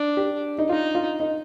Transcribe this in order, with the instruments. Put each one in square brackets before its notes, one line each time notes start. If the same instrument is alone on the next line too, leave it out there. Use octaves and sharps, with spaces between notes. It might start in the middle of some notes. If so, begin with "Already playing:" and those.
Already playing: [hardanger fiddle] D4
[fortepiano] G4
D#4
[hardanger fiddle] D#4 [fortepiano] F4
[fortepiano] F4
D#4